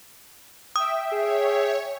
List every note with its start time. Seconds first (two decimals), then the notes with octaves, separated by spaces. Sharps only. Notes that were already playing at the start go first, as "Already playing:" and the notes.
0.76 E5 G5 D#6
1.12 G#4 C#5